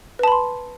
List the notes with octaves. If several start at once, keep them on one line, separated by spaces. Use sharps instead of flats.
B4 A5 B5 C6